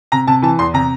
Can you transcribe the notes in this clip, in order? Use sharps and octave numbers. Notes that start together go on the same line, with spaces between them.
C3 A#5
C3 A5
E3 A5
E2 C6
C3 A#5